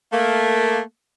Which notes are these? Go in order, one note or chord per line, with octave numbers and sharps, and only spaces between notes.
A3 A#3